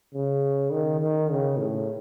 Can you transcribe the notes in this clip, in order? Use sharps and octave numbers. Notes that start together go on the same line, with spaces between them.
C#3
D#3
D#3
C#3
A2